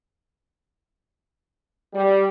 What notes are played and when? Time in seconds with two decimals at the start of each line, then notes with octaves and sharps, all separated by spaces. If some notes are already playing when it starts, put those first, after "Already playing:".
1.94 G3